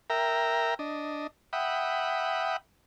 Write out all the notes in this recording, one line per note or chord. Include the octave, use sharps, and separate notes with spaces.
A#4 E5 G5 A#5
D4 D#5
E5 F#5 G5 B5 D#6